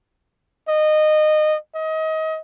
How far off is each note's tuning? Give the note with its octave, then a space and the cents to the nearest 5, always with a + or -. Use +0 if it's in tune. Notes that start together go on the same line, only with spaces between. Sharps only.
D#5 -20
D#5 +30